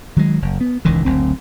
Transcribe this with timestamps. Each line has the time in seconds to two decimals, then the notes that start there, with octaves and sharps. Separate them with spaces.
0.16 D#3 F#3 G#3
0.42 F#1
0.61 B3
0.85 E1 C#2 D#3 E3
1.05 F#1 D2 C4